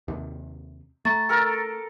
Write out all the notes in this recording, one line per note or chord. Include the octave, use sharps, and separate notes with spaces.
D#2 C3
A3 A#5 C#6 A6
A4 A#4